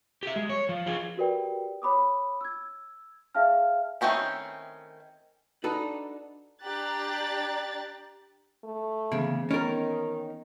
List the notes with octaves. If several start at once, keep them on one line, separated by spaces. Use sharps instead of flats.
G4 E5
G#3
C#5
F3
F4 G#4
F#4 G4 A#4 B4 D5 G5
C#5 B5 D6 D#6
E6 G#6
G#4 E5 F5 G5 A5 F6
D#3 A3 C4 C#4 E4
D4 D#4 F#4 A4 B4
D4 G4 A#5 F#6 A6
A3
D2 C#3 E3 A#3 B3
D#3 B3 C#4 D#4 A#4 A6